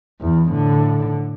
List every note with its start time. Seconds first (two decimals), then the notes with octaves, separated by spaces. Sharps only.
0.21 E2 E3
0.51 A2 D3